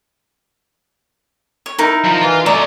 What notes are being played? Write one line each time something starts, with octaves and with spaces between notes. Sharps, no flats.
C#5
D#4 E4 A#4
F3 A#5
E3 F4 F5
A3 D5 D#5 A#5